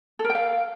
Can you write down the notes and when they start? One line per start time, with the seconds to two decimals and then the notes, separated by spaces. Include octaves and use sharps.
0.19 A4
0.24 A#4
0.30 G5
0.35 F5